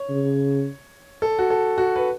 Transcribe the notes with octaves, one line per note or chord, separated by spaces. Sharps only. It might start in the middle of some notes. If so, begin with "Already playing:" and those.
Already playing: C#5
C#3
A4
F#4
A4
F#4
B4